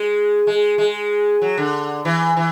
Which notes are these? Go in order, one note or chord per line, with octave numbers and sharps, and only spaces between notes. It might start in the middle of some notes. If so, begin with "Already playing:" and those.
Already playing: G#3
G#3
G#3
F#3
D3
E3
E3